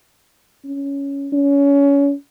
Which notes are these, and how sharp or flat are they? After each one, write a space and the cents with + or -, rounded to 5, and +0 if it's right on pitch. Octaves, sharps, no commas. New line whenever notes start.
C#4 +10
C#4 +25